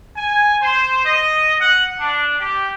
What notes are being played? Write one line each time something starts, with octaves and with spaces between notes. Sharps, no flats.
G#5
C5
D#5
F#5
D4
G4